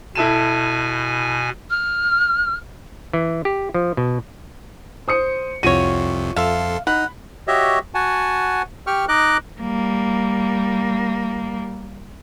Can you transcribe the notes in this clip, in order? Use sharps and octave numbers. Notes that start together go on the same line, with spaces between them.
B2 E4 A4 G#5 E7
F6
E3
G4
F3
B2
C5 D#6 C#7
C2 F2 C3 F4 F#4 C#5 D#7
F2 A4 E5 F5 C6
D#4 F#5 B5
F#4 G4 C#5 D#5 E5
F#4 F#5 G#5 A5
G4 G5 C#6 F6
D#4 D#5 D6 F#6
G3 A#3